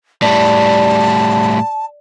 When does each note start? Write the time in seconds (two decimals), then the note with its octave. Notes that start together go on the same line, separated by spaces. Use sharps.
0.22 A2 G3 D5 A5